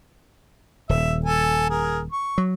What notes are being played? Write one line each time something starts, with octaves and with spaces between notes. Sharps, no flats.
D#1 E5
A4 G#5
G#4 A#4
C#6
F#3